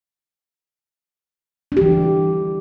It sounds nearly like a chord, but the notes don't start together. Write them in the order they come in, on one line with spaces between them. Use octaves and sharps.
D4 G4 E3